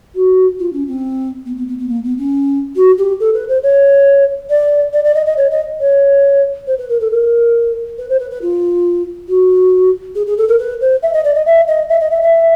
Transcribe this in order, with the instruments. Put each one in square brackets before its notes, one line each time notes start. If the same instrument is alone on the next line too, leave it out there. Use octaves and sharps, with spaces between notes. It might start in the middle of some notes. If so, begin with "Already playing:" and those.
[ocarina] F#4
F4
C#4
C4
B3
B3
B3
B3
A#3
B3
C#4
F#4
G4
A4
B4
C5
C#5
D5
D5
D5
D#5
D#5
C#5
D#5
C#5
C5
B4
A#4
A4
A#4
B4
C5
B4
B4
F4
F#4
G#4
G#4
A4
A#4
B4
C5
E5
D#5
D5
D#5
E5
D#5
E5
D#5
E5
E5